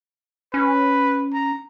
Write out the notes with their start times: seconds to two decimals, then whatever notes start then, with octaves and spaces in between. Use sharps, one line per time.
0.54 C#4 B4
1.33 A#5